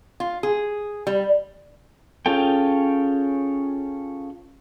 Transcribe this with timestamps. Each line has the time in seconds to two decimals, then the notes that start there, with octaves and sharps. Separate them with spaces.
0.20 F4
0.43 G#4
1.07 G3
2.26 C#4 F4 G#4 A4 G5